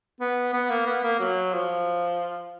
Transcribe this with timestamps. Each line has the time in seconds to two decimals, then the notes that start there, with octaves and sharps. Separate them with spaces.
0.21 B3
0.53 B3
0.70 A#3
0.86 B3
1.03 A#3
1.20 F#3
1.53 F3